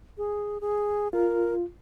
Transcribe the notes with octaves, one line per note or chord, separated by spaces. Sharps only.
G#4
G#4
F4 A#4